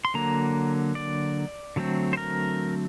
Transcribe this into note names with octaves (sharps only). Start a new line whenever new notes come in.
C6
D3 F#3 A#3 A#5
D5
D3 F#3 A3 C4
C5
A#4